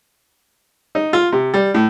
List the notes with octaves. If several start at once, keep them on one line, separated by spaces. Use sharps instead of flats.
D#4
F4
C3
G3
A2